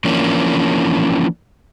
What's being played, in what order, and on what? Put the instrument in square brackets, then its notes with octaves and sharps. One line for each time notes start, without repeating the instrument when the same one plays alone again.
[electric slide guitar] E3 F3 A#3 C#4 D4